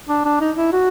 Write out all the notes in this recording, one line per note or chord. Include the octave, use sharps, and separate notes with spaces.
D4
D4
D#4
E4
F#4